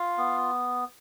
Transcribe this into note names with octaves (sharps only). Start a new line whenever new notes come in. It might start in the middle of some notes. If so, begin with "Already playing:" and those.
Already playing: F4 F5
B3